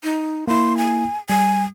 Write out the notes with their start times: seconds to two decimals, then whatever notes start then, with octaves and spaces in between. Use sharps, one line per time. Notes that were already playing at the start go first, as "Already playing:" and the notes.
0.04 D#4
0.48 A#3 E4 C6
0.77 G#5
1.30 G3 G#5